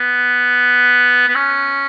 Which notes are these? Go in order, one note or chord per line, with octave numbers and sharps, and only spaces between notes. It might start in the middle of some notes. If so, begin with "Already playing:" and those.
Already playing: B3
B3
C#4